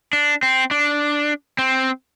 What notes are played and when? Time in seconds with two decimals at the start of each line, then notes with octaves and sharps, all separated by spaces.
0.13 D4
0.43 C4
0.71 D4
1.59 C4